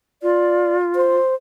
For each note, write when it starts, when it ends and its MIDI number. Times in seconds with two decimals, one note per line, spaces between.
0.23 1.18 65
0.23 0.77 74
0.96 1.35 72